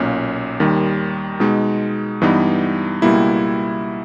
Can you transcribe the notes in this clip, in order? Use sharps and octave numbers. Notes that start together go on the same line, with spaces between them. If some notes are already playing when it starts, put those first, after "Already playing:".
Already playing: B1 A#2 A#3 C#4
D#2 D#3 G3
B2 G#3 D#4
G2 E3 G3 B3 D#4
C#2 B2 G3 A#3 E4